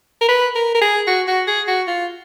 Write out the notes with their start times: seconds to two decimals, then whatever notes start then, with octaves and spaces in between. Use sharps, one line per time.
0.21 A#4
0.28 B4
0.55 A#4
0.74 A#4
0.81 G#4
1.07 F#4
1.27 F#4
1.47 G#4
1.67 F#4
1.87 F4